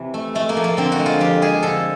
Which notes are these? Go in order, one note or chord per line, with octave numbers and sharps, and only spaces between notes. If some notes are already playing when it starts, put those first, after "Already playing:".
Already playing: C3 E3
A3
G#3 A3
A#3
F3
A#3
D3 C4
F#4
G#3
F4
F2 G4
G#3 G#4
D3 A4